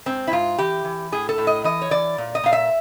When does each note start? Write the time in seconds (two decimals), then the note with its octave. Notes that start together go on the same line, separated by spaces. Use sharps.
0.06 G#2 C4
0.27 E4
0.32 G#2 F4
0.58 E3 G4
0.85 E3
1.12 A2 G#4
1.29 A4
1.38 A2
1.47 D#5
1.64 E3 D#5
1.82 C#5
1.91 E3 D5
2.18 A#2
2.35 D#5
2.44 A#2 F5
2.53 E5